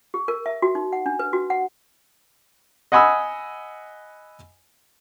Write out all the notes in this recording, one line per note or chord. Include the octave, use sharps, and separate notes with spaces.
G4
A#4
E5
F#4
D#4
F#5
D4
B4
F#4
F#5
D#5 F#5 G#5 B5 D#6 E6